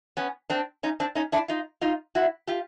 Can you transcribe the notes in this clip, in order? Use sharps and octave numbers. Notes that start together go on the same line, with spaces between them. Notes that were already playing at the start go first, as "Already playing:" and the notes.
B3 C#4
C4 D4
C#4 D#4
C4 D4
C#4 D#4
D4 E4
D#4 F4
D#4 F4
E4 F#4
F4 G4